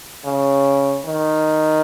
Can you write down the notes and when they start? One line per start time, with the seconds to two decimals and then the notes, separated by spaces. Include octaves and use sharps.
0.25 C#3
1.06 D#3